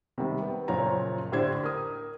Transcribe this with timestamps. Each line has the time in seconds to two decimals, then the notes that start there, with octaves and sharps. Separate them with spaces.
0.18 C3 D#3 G3
0.42 B3
0.68 F#1 A#2 F3 C#5 A#5
1.32 A2 D3 G4 C5 D5 G#6
1.63 A#4 D#6